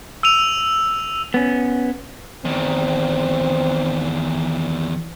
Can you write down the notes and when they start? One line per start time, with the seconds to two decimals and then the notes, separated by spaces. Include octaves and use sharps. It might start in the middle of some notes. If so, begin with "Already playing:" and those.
0.23 E6 D#7 F7
1.34 B3 C#4
2.45 E2 D#3 C4